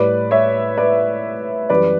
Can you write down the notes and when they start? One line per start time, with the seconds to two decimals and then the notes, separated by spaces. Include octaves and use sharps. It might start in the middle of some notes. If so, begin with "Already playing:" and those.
Already playing: A2 G3 B4 D5
0.31 C#5 E5
0.78 B4 D5
1.69 F#2 E3 G3 B4 D5